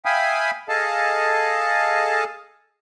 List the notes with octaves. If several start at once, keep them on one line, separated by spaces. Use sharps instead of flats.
E5 F5 G5 G#5 B5 D#6
G#4 A4 D#5 F5 A5